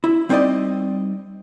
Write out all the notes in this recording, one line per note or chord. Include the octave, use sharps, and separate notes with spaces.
E4
G3 C4 D#4 C5 D5 D#5